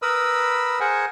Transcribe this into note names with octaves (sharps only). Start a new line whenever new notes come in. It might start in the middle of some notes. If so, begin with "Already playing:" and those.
A#4 B4 B5 D#6 E6
G#4 A#4 C5 F#5 G#5